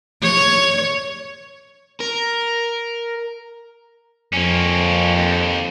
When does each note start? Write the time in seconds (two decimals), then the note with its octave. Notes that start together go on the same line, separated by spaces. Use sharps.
0.23 C#5
2.01 A#4
4.33 F2 A#3 C#4
5.16 D#2